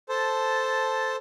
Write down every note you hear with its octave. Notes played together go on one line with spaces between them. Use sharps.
A4 C5 A5